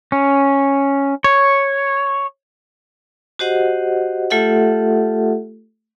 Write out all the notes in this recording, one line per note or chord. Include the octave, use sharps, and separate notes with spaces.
C#4
C#5
F#4 G4 C5 D#5 F#5
A3 F4 G4 A4 E5 F#5